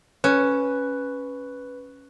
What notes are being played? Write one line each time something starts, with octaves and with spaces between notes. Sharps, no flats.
C#4 B4